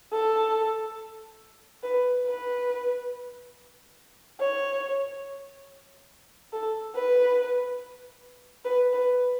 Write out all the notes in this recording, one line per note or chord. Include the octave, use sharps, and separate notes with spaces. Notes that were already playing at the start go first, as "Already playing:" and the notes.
A4
B4
B4
C#5
A4
B4
B4
B4